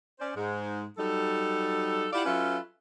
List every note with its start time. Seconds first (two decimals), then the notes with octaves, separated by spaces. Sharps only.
0.19 C#4 C5 D5
0.35 G#2 G#3
0.98 F#3 G3 D#4 A4
2.13 E4 F4 G4 D5 F5 F#5
2.25 F#3 C#4 F4 A4 B4 E5